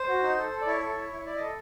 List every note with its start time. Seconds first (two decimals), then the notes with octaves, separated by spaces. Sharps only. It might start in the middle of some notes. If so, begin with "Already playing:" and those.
Already playing: C5
0.08 F#4
0.23 D#4
0.38 A4
0.51 A4
0.61 D5
0.67 E4 C#5
0.81 A4
0.96 E4
1.11 E4
1.25 E4 D5
1.36 A4 D#5